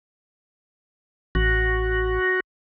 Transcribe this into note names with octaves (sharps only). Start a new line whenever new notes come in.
A1 F#4